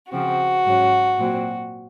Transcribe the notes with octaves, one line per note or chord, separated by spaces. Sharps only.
C#3 F3 C4 F#4
G#2 F#3 C#4
A#2 F#3 C4